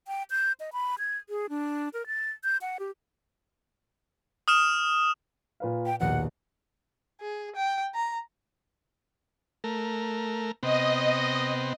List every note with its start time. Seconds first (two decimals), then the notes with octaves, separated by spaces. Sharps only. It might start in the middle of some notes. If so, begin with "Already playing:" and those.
0.08 G5
0.31 G6
0.60 D#5
0.73 B5
0.99 G#6
1.29 G#4
1.49 D4
1.94 A#4
2.07 A6
2.44 G6
2.61 F#5
2.80 G4
4.48 D#6 F6 E7
5.60 A#2 B4 F5
5.86 G5
6.00 A#1 D#2 B2 F#5
7.21 G#4
7.55 G5
7.95 A#5
9.64 A3 A#4
10.63 C3 B3 C4 D#5